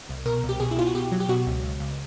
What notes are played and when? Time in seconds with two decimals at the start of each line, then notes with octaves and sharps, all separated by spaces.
0.09 C2
0.26 B2 A#4
0.43 C2
0.49 G4
0.60 B2 G#4
0.71 E4
0.77 B2 F4
0.87 F#4
0.95 B2 G4
1.12 F#3
1.20 G4
1.29 B2 F#4
1.46 C#2
1.64 C#2
1.80 C#2